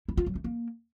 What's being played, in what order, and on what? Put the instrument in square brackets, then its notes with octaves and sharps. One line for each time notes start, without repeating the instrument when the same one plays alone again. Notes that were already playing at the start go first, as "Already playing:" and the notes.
[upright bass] E4
F4
F#3
A3
A#3